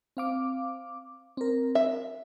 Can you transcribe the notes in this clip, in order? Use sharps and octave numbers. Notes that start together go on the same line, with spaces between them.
C4 F5 D6
C4 A#4
E5